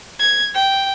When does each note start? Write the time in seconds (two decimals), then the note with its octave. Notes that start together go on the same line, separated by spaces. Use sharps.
0.19 G#6
0.54 G5